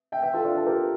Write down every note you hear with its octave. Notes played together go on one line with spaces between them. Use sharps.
E5 G5
E5 G5
F4 A4
D4 F4
F4 A4
G4 A#4